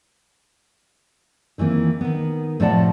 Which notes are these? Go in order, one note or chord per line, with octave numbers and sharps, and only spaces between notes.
D#3 E3 G3 A#3 C4
D#3 B3
A2 C3 F3 D5 F#5 A5